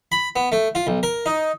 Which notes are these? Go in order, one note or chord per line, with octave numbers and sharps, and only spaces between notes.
B5
B3
A3
F4
B1
A#4
D#4